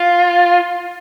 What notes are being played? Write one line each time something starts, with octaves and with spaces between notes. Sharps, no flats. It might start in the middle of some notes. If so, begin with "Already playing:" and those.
Already playing: F4